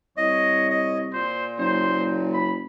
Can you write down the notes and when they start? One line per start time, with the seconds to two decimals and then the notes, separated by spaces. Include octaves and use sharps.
0.17 C2 C#5 D#5
0.70 D#5
1.13 A#2 C5
1.58 F#1 C5
2.34 B5